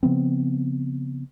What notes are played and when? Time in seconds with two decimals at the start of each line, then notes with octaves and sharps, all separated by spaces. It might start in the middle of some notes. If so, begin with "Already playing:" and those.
0.03 C#3 F3 B3 C4